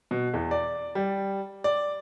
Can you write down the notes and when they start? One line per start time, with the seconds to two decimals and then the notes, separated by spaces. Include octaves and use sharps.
0.11 B2
0.34 E2
0.51 D5
0.95 G3
1.64 D5